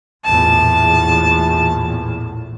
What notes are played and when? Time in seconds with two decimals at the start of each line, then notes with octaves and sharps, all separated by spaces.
0.25 A#1 E2 A2 A5